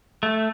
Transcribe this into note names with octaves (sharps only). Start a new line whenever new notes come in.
A3